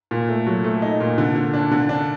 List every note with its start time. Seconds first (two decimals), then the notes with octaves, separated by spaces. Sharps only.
0.11 A#2
0.29 A3
0.46 F#3
0.64 A3
0.82 D#4
1.00 A#2
1.18 D3
1.36 D3
1.53 D4
1.71 D3
1.89 D4